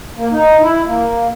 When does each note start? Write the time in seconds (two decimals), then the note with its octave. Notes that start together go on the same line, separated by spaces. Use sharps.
0.17 A#3
0.31 D#4
0.62 E4
0.85 A#3